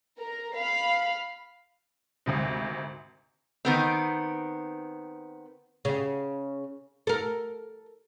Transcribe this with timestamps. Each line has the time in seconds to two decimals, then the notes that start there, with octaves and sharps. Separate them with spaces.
0.17 A#4
0.54 F5 B5
2.26 G#1 D2 C3
3.65 D#3 B3 C4
5.85 C#3
7.07 A4 A#4